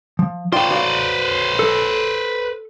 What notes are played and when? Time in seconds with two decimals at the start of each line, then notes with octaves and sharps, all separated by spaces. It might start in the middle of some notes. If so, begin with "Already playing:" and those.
0.19 F3
0.53 F4 B4 C5 D5 G5
0.71 F#4 D5 F5
1.59 A4